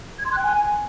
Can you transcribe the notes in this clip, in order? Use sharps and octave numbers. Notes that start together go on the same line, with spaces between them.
G#6
C6
F#6
G5
G#5